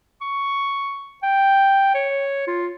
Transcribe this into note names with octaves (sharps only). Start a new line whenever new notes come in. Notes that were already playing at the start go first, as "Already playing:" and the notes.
C#6
G5
C#5
F4